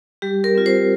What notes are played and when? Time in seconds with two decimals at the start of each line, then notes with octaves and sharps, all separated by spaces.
0.22 G3 G4
0.44 A#4
0.55 C4 F4
0.66 C5